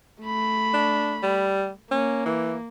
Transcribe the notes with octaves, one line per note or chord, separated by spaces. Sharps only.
A3 B5
D4
G3
A#3 C#4
E3